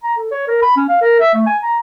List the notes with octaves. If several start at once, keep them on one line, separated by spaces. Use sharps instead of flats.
A#5
A4
C#5
A#4
B5
C#4
F5
A#4
E5
A3
G#5
A#5